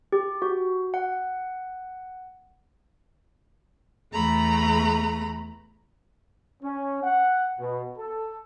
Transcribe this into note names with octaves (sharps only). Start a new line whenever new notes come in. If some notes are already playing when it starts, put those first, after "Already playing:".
G4
F#4
F#5
E2 A3 A#5 B5
C#4
F#5
B2
A4